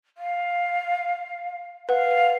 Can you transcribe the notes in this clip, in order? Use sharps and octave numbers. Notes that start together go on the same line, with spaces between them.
F5
B4 F5 F#5